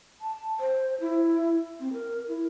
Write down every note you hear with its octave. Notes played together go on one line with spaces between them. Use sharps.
A5
C5
E4
C4
A#4
E4